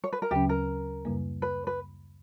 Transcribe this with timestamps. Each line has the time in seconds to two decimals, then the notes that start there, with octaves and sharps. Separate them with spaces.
0.04 C#5
0.13 B4
0.22 A#4
0.31 D2 C#3 F#3 C#4 G4
0.49 A#4
1.05 F#2 C#3 G3 A#3
1.42 B4
1.67 B4